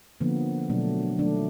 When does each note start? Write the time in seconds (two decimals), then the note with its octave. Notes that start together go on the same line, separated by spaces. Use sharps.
0.21 D3 F3 A#3 B3
0.69 B2 F#3 A3 D4
1.19 D#3 F#3 A3 D4